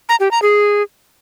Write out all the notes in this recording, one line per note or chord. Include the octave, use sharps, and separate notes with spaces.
A#5
G4
A#5
G#4